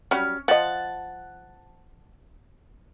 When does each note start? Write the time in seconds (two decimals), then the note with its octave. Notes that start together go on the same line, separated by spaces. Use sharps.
0.11 F#3 G3 C#4 B5 F6
0.48 F3 D#5 F#5 A5